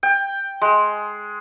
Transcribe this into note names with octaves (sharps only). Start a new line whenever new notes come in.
G5
G#3